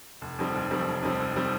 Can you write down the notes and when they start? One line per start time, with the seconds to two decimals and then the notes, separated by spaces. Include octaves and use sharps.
0.21 F1
0.39 F2 D#3 G3 C4
0.55 F1
0.71 F2 D#3 G3 C4
0.86 F1
1.02 F2 D#3 G3 C4
1.20 F1
1.36 D#3 G3 C4